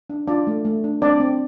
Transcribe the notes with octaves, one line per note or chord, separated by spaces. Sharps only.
D4
D4 F4 D5
A3
A3
D4
C4 D4 D5
C4